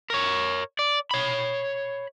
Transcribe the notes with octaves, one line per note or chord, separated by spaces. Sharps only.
A#4 C#5
D5
C#5 B5